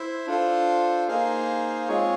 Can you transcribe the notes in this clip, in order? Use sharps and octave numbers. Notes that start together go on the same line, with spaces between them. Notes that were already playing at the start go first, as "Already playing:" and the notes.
Already playing: E4 C5 E5
D4 F4 A4 C5
A#3 D#4 G#4 C5 F5
G#3 C4 F4 G#4 C#5